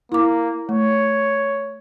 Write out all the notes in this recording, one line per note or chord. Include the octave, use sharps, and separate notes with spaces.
A#3 E4 D6
A3 C#5